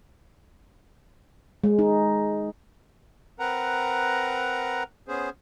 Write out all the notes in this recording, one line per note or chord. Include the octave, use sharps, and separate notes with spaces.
G#3
D#4
C4 A#4 B4 F#5 A#5
B3 C#4 G#4 C5